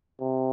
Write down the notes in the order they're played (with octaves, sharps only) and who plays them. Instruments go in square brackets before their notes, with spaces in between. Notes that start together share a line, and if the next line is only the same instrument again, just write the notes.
[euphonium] C3